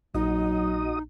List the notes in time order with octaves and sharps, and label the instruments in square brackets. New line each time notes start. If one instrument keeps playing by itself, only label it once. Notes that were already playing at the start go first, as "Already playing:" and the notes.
[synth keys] A#1 [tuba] F#3 [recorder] D#4 [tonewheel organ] F#4 D#5 D#6